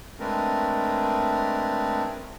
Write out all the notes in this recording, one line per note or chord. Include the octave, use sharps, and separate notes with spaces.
G#3 A3 C4 D4 A#4 B4